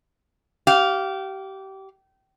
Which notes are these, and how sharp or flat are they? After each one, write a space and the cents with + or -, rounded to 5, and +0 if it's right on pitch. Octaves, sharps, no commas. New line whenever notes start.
G4 -25 F5 +0